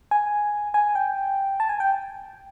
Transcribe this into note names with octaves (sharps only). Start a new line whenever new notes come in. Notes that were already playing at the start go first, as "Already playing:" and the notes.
G#5
G#5
G5
A5
G#5
G5